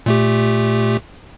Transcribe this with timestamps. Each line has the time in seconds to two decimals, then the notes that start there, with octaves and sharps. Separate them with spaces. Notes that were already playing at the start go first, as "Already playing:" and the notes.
0.06 A#2 A3 G4